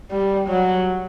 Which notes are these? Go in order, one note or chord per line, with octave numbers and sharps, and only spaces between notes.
G3
F#3